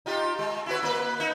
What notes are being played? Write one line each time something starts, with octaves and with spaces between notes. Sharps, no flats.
D#4 F4 G4
G#3
E4 F#4 B4
A#3 B4
D#4